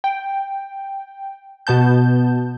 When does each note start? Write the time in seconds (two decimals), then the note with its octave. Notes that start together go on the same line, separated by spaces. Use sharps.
0.04 G5
1.67 B2 B3 A5 G6